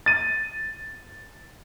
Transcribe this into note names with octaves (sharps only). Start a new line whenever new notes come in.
A6 D#7